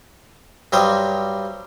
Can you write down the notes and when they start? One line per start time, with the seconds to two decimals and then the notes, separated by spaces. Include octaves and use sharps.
0.72 G2 F#3 G3 C5 D#6